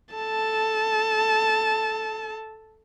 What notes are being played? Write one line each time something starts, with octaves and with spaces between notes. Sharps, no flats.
A4 A5